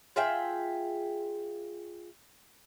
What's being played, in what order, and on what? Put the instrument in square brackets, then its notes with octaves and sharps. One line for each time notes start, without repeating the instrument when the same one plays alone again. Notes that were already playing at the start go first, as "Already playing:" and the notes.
[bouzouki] F4 G#4 E5 G5